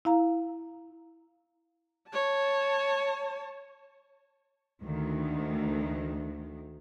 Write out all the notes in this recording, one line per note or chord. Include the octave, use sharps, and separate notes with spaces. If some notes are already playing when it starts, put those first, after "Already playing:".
E4 F5 A#5
C#5 A5
D2 D#3